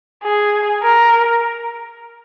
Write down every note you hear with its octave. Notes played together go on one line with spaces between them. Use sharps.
G#4
A#4